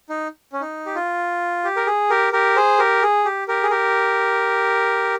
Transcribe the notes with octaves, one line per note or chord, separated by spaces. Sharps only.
D#4
C#4
D#4
G4
F4
G4
A#4
G#4
G4 A#4
G4 A#4
G#4 C5
G4 A#4
G#4
G4
G4 A#4
G#4
G4 A#4